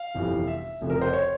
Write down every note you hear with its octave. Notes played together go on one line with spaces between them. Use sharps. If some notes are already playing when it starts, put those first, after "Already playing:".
Already playing: F5
G1 F2 C3 E3 G3
E5
F1 F2 C#3
A#4
C5
C#5